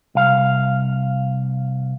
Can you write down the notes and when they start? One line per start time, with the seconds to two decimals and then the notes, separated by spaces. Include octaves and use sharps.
0.15 C2 F5